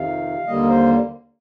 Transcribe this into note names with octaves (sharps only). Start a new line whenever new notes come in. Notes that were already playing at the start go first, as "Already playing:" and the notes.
Already playing: F2 C3 D#3 F5
D#2 D3 G3 A#3 D#5
A#4
C5